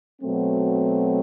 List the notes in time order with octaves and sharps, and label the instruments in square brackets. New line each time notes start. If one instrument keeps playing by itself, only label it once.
[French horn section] B2 F#3 A3 C4